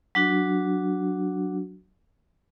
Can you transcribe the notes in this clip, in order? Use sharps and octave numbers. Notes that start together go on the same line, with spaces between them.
F#3 D4 F#4